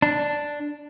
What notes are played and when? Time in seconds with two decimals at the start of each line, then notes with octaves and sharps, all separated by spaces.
0.02 D4